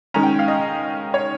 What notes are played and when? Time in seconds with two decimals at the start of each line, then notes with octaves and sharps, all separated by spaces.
0.14 D#3 G#3 C#4 A#5
0.23 G5
0.39 F5
0.48 D#5
1.14 C#5